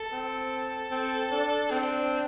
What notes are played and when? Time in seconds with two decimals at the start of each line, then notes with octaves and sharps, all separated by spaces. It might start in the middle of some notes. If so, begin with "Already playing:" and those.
Already playing: A4
0.12 C4
0.92 C4
1.31 D4
1.71 C4 D4